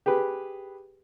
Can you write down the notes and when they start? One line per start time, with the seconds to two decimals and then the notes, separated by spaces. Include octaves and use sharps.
0.06 G4 G#4 B4